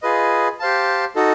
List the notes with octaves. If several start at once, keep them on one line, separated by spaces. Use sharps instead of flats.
F4 G#4 B4 D#5
G4 C5 F5 A5
D#4 F#4 A4